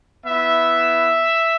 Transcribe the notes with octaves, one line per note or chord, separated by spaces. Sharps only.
B3 E4 E5